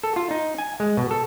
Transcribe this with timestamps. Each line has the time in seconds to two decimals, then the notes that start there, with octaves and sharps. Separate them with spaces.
0.03 A4
0.16 F4
0.31 D#4
0.58 G#5
0.80 G#3
0.97 B2
1.11 A4